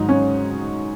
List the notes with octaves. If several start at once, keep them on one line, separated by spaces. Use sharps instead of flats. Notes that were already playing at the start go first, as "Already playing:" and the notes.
Already playing: G#2 D#3 F#3 D#4
C#4